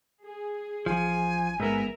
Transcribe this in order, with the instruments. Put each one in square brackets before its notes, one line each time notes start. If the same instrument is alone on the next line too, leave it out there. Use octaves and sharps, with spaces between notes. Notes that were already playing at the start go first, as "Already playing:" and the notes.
[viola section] G#4
[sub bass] A1 [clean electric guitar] F3 [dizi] G#5
[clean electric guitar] G#2 B3 [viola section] A#4 E5